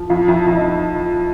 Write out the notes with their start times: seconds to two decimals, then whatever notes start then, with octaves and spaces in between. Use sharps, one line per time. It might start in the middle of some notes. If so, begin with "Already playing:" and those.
Already playing: F3
0.10 F2 F4 F5
0.28 F2 E4 E5
0.47 F2 E5
0.57 D#4 D#5